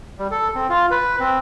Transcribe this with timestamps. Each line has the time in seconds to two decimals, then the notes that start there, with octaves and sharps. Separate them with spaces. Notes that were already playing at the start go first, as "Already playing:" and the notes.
0.19 G3
0.31 A4
0.55 C4
0.70 F4
0.91 B4
1.20 C4